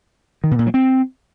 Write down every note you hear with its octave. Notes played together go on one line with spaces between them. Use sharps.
D#3
B2
A#2
F#3
C4